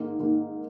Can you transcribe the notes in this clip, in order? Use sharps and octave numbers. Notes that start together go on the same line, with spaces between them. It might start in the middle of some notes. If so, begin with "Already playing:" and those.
Already playing: G#2 D#3 A#3
G#2 D#3 A#3